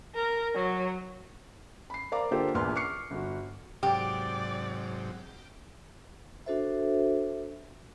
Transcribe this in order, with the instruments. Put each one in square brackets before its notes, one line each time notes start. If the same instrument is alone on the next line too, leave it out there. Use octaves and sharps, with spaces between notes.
[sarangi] A#4
F#3
[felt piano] B5 C7
A#4 C5 D5 F5 A#5 D6
D3 A#3 F4 G4 A4 C5
A#1 E2 A#2 B4 C6 F6
C#6 D6 F6 C7 C#7
G1 F#4
[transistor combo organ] G#2 C3 F#3 [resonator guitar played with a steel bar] G4 [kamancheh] D5
[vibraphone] D4 F#4 A4 C5 E5